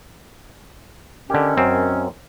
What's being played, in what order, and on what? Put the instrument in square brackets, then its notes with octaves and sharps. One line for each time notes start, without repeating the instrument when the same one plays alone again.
[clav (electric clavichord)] D3 G4 [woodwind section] D#3 C#4
[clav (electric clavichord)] F#2 C4